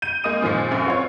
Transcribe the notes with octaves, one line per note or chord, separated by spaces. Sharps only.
G6 D#7
G#3 A#3 D#5 D#6 D#7
A#2 D#3 F3 G#3
F1 F#2
C4 F4 C#5